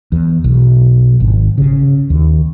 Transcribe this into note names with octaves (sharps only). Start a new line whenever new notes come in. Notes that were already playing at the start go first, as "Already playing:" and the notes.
E2
B1
G#1
C#3
D#2